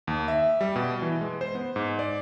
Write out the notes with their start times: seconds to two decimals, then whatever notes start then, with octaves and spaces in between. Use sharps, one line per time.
0.07 D#2
0.28 E5
0.61 G3
0.76 B2
1.02 E3
1.21 G#3
1.41 C5
1.55 B3
1.76 G#2
1.99 D5